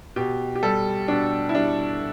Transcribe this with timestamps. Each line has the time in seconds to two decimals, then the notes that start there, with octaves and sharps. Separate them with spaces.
0.16 B2 G4
0.55 G4
0.63 G3 A4
1.08 B2 D4
1.49 E4
1.55 G3 D4